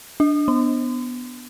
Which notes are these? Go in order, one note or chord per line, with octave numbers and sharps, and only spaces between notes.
D4
B3